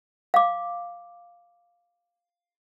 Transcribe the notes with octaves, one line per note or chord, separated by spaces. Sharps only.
F5 D6